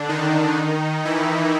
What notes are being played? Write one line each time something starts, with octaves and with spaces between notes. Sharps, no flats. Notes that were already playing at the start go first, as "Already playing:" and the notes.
Already playing: D3 D4
D#3 D#4
E3 E4